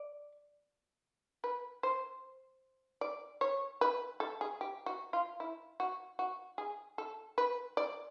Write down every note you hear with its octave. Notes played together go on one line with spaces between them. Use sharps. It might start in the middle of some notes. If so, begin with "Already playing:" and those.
Already playing: D5
B4
C5
D5
C#5
B4
A4
G#4
G4
F#4
F4
E4
F#4
F#4
G#4
A4
B4
D5